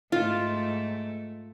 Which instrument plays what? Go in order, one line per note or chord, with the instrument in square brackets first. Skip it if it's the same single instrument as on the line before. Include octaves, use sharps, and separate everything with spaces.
[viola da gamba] G#2 A3 [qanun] F4